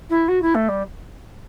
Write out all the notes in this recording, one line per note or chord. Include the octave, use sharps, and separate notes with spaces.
E4
F#4
E4
A3
G3